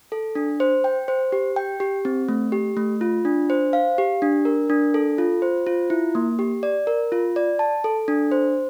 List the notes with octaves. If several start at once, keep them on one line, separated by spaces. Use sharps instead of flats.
A4
D4
C5
G5
C5
G4
G5
G4
C4
A3
G4
A3
F4
D4
C5
F5
G4
D4
A#4
D4
A4
F4
C5
F4
E4
A#3
G4
D5
A#4
F4
D5
A5
A4
D4
C5